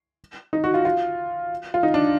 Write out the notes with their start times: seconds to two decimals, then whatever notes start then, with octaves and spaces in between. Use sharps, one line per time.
0.53 D#4
0.64 F#4
0.74 F4
0.85 F4
1.74 F4
1.83 D#4
1.94 D4